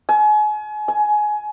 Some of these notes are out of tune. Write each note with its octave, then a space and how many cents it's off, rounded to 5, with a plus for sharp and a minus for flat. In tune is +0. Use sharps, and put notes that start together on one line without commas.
G#5 +35
G#5 +20